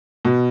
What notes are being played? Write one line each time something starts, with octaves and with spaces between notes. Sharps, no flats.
B2